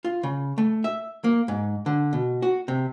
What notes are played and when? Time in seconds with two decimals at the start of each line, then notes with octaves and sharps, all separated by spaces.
0.05 F4
0.23 C#3
0.58 A3
0.84 E5
1.24 A#3
1.48 G#2
1.86 D3
2.13 B2
2.42 F#4
2.68 C3